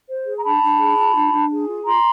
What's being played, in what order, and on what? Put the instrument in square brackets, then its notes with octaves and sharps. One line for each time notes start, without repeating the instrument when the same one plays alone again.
[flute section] C5
G#4
A#5
D4 A5 B5
D4
G#4
F4
D4
D4
G#4
F4
F4 A#5 C6